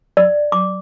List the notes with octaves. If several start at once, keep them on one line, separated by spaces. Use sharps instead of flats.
D5
D6